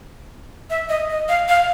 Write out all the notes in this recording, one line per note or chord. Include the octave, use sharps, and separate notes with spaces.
E5
D#5
D#5
F5
F5